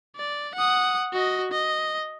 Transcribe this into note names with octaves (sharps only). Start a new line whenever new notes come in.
D5
F#5 D#6
F#4 D#5
D#5